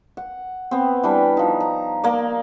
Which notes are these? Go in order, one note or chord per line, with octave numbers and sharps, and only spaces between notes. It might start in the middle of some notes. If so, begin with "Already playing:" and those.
F#5
B3 C4
E3 G3 D4 B5
F3 D#4
A#5
A#3 A#4 D5